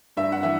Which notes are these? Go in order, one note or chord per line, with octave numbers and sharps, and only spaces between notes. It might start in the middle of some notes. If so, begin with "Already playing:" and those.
G2 E5
F#5
E3 E5